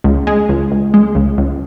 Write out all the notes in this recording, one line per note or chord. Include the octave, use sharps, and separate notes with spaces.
C#2
G#3
C#2
C#2
G#3
C#2
C#2